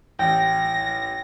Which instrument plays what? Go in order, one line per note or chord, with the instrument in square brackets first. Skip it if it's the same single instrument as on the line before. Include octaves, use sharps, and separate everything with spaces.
[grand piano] A1 [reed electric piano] G5 [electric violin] A#6